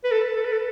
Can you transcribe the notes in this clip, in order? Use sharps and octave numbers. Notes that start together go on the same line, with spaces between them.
B4
A4
A4
B4
A4